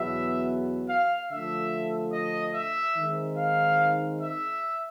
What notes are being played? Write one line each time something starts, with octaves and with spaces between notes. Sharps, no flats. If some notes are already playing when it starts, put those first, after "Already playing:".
Already playing: E2 B2 F#3 B3 E5
F5
D3 F3 A3 E5
D#5
E5
D#3 G#3 C4 D#4
F5
E5